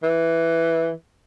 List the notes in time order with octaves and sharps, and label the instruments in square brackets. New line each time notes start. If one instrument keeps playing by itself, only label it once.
[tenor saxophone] E3